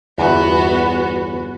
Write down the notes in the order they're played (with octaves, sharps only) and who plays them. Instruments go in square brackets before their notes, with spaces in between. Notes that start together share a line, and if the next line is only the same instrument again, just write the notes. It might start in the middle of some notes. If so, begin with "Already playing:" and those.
[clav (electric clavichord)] G1 E2 [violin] B3 F#4